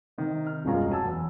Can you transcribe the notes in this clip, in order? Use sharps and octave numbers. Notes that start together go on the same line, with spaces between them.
C3 D#3
F6
D#1 F#2 B2 G#3 F4 A#5
F#3 G#5 A5 E6
E2